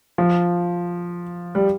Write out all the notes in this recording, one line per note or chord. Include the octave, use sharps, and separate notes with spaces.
F3
G3